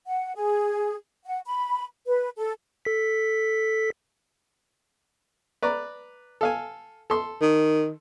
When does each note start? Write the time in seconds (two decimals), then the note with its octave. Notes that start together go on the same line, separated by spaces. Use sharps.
0.07 F#5
0.36 G#4
1.26 F#5
1.46 B5
2.07 B4
2.37 A4
2.85 A4 B6
5.62 B4 D5 A#5
6.41 A4 F5 G#5
7.10 A4 C6
7.41 D#3